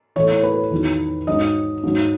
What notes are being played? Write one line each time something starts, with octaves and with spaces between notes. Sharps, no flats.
A2 E3 C#5
B4
E2 D#3 F#3
G#2 F#3 D#5
G#2 F#3